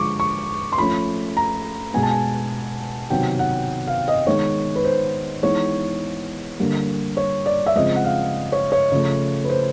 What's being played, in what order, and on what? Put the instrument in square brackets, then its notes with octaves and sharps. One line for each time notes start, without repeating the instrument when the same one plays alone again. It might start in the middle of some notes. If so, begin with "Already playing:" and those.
Already playing: [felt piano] D3 F3 G#3 C#6 D6
C#6
C6
F3 A3 C#4 B5
A#5
B2 G#3 B3 G#5
A5
G#5
C3 D#3 F#3 B3 G5
F#5
F5
D#5
D#3 G#3 B3 C#5
B4
C5
E3 G#3 B3 D#4 C#5
D3 G3 A#3
C#5
D5
E5
C#3 F3 G#3 C4 D#5
F#5
F5
C#5
C#5
C#3 F3 A3
B4
C5